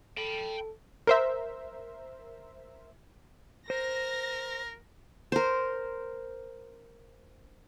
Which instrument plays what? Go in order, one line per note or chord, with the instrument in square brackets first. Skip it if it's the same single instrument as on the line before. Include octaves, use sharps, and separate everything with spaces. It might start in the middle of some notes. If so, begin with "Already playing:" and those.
[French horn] A4 [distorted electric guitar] G5 B5
[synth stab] A#4 C5 E5
[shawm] A#4 [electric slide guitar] C5 [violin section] A#6
[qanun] A#4 C5